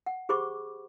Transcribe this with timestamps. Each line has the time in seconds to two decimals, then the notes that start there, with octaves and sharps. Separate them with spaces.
0.06 F#5
0.29 G4 G#4 C5 B5 C#6 D6